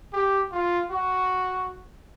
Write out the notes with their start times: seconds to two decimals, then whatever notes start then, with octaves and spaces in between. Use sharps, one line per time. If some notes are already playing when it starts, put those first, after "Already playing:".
0.13 G4
0.52 F4
0.90 F#4